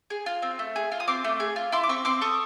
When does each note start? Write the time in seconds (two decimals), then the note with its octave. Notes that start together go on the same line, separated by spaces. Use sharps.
0.10 G#4
0.26 F4
0.42 C4
0.59 A3
0.76 G#4
0.92 F4
1.00 D#6
1.07 C4 C6 D6
1.24 A3
1.40 G#4
1.56 F4
1.72 E4 C6 D6
1.83 D6
1.89 C4 B5 C#6
2.05 C4 C6 D6
2.21 A4 C#6 D#6